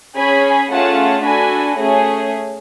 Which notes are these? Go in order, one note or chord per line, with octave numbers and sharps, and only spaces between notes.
C#4 G#4 G#5 B5
A3 C#4 F4 G#4 F#5 A5
D4 F#4 A4 G#5 B5
A3 C#4 G#4